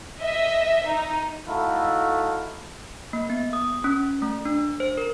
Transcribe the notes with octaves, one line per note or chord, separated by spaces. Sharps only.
D#5 E5
D#4
A3 D#4 E4 F#4 A4 F5
A#3
B3
D#6
C#4
A3
D4
C5
A#4